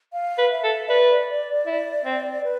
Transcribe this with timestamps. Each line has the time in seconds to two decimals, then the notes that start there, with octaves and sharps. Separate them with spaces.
0.13 F5
0.38 B4
0.50 E5
0.64 A4
0.89 B4 D5
1.66 E4
2.05 C4
2.44 B4